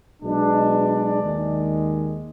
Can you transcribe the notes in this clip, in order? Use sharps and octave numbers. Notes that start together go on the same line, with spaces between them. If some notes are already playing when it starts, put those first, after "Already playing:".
B1 B2 G#3 D4
D5
D#2 D#3 G#3